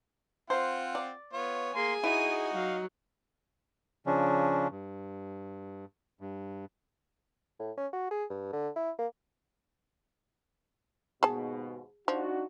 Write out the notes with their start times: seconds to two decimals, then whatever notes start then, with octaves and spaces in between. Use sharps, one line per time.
0.50 C4 F4 C5 F#5
0.95 D5
1.33 B3 F4 C#5
1.74 A#3 G#4 G#5 C6
2.04 D#4 E4 F#4 D#7
2.53 F#3 F5
4.06 C#3 F3 C#4 D4
4.71 G2
6.21 G2
7.59 A2
7.77 C#4
7.93 F#4
8.11 G#4
8.30 G2
8.53 D3
8.76 E4
8.99 A#3
11.23 D#2 G#2 B2 G#4 A5
12.08 F3 D4 D#4 F#4